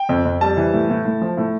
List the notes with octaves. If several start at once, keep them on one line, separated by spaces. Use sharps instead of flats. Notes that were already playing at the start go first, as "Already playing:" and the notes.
Already playing: G5
F2
F2
G3 A5
E3
A2
A2
A2
F3
A2